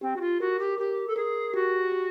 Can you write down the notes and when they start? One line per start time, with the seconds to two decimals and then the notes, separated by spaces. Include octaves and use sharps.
0.01 C4 G4
0.16 F#4
0.20 F4
0.40 F#4 A#4
0.59 G4
0.78 G4 A#4
1.07 A4
1.16 G#4 A#4
1.54 F#4 G4
1.92 G4